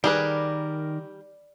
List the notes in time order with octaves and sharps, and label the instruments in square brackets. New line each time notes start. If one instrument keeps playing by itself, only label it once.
[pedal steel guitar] D#3 A#4 [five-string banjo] G3 G#4 B4 [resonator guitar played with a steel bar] D5